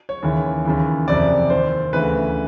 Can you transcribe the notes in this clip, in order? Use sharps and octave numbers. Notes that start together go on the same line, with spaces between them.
C#5
D#2 C#3 E3
D#2 C#3 E3
F2 C3 E3 D5
D#2 D#3 C5
D2 C#3 E3 B4